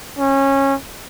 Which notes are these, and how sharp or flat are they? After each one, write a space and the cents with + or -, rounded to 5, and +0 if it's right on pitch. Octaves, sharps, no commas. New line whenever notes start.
C#4 -20